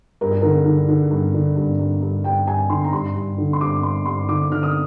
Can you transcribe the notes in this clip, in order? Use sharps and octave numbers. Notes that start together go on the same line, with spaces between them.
G2 A#4
G#4
D3 A#4
D3
D3
G2
D3
G2
G2
G2
G2 G5
G2 G#5
D3 C6
A#5
G2 C6
G2
D3
C6
G2 D6
G2 C6
G2 C6
D3 D6
D3 F6
D#6